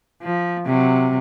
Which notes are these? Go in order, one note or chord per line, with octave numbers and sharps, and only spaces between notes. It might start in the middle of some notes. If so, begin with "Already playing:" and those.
F3
C3 F#3